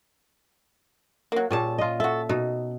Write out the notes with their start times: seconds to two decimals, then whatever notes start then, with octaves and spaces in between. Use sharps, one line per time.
1.32 F#3 A#3
1.51 A#2 G3 C#4 G#4 A5
1.78 F4 D#5
2.00 F#4 A4 E5
2.29 B2 D#4